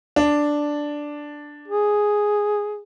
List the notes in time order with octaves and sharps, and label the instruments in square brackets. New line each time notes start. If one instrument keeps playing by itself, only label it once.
[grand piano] D4
[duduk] G#4